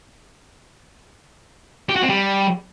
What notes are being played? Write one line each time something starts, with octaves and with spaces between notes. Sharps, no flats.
G4
F#4
C4
G3